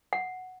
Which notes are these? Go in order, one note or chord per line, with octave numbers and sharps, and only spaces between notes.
F#5